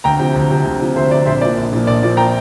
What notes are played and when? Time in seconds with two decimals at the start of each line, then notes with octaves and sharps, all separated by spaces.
0.04 D2 G5 A#5
0.19 C3 F3
0.35 D2
0.50 C3 F3
0.65 D2
0.80 C3 F3
0.96 D2 C5 E5
1.11 F3 D5
1.14 C3
1.26 A#1 C5 E5
1.41 A#2 F3 D5
1.57 A#1
1.73 A#2 F3
1.87 A#1 D5
2.02 A#2 F3 D5
2.17 G5 A#5